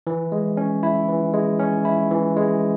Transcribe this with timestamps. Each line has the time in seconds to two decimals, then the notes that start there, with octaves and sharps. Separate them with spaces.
0.07 E3
0.32 G#3
0.57 C#4
0.83 E4
1.08 E3
1.34 G#3
1.59 C#4
1.85 E4
2.11 E3
2.37 G#3